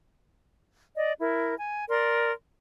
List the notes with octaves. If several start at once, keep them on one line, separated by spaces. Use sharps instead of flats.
D5 D#5
E4 A#4
G#5
A#4 D5 C6